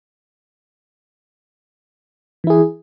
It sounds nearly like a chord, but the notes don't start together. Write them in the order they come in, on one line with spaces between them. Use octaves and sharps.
E3 E4 G#4